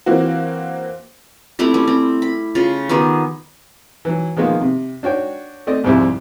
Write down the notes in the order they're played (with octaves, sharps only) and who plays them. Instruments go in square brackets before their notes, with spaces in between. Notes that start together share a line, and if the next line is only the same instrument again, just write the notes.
[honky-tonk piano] E3 A#3 C4 F#4
[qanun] G3 A3 C4 E4
G3 C#4
C4
B5
C#3 F4
D#3 B3 G4 G#4
[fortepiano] E3 F#3
D#3 F3 G#3 A#3 B3
C3
D4 F#4 C#5 G5
A3 C4 D5 D#5
C2 F2 G#2 G3 E4